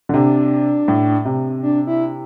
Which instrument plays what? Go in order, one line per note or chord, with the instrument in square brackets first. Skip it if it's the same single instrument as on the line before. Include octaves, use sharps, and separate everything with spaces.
[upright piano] D3
[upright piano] C3 [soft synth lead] D4
[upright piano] A2
C3
[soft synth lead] D4
E4